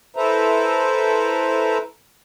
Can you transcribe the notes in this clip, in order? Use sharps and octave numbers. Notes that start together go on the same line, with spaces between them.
E4 A4 B4 C5 E5 A#5